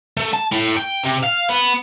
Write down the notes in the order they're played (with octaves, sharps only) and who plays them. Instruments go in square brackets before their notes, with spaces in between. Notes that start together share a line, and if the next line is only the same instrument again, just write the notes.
[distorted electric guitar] A3
A5
A2
G5
C3
F5
B3